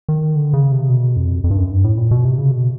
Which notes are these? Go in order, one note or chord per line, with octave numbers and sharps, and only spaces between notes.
D#3
D3
C#3
C3
B2
F2
F2
G2
F#2
G2
A2
A#2
B2
C3
C#3
B2